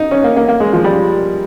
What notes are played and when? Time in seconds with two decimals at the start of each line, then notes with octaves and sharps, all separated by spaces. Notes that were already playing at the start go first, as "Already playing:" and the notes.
Already playing: D#4
0.11 C#4
0.24 A#3
0.37 A#3
0.48 A#3
0.60 G#3
0.73 F3
0.84 G3